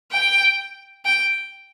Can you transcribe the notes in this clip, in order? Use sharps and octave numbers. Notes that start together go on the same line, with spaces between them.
G5
G5